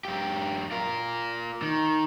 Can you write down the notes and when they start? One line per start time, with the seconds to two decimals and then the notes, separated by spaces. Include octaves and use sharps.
0.05 F#2 G4
0.71 F4 A#4
1.62 D#3